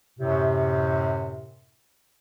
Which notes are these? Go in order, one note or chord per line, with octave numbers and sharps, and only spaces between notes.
F#2 A2 C3